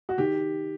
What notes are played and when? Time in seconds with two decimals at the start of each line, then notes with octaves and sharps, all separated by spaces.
0.09 F#4
0.18 D#3 G4